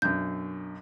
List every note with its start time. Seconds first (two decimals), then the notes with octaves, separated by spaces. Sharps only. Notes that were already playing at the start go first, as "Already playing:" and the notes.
0.02 B1 F#2 D4 G6